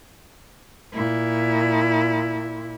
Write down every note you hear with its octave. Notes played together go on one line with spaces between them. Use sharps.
A#2 E4